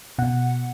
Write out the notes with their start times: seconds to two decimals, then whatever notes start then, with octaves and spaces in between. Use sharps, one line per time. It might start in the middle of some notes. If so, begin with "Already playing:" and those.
0.18 B2 F#5